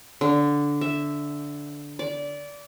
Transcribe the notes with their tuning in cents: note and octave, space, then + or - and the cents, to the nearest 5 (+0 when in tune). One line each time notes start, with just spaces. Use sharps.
D3 -10
E5 +0
D5 -20